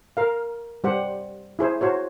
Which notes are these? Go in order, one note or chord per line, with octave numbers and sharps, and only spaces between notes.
A#4 F5
G3 G4 C5 F#5
E4 G#4 C5
F#4 C5 C#5